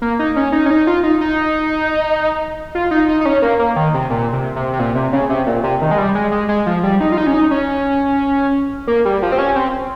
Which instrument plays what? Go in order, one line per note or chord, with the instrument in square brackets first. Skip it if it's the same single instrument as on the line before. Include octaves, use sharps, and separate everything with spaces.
[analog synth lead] A#3
D#4
C#4
D#4
C#4
D#4
F4
D#4
D#4
F4
D#4
D#4
D#4
C#4
A#3
A#3
D#3
C3
A#2
C3
C3
C3
A#2
C3
C#3
C3
A#2
C3
D#3
G#3
G3
G#3
G#3
G#3
F3
G3
D#4
F4
D#4
C#4
D#4
C#4
A#3
G3
F3
C4
C#4
C4